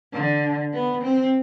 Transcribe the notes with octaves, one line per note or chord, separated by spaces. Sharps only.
D3
B3
C4